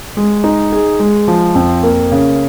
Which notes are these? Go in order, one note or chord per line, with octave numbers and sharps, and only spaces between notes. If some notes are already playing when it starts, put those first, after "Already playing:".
G#3
D#4
G#4
G#3
F3
F2
A#3
C#3